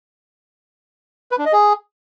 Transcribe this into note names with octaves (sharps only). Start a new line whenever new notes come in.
B4
D4
D#5
G#4